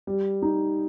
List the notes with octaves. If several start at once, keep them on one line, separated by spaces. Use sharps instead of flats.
G3
D#4